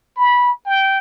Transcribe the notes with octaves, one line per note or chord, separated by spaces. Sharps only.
B5
G5